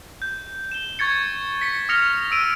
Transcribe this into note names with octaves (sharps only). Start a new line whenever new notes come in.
G6
E7 G7
C#6 G#6 A6 C#7
B6 C#7
D#6 F6 A#6 C#7 F7
E6 D7 D#7 F7